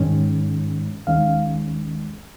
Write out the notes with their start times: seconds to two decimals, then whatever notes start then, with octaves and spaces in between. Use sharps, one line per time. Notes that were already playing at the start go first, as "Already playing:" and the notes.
Already playing: G#2 D#3 G#3 C#4
1.07 D#2 D#3 G#3 C#4 F5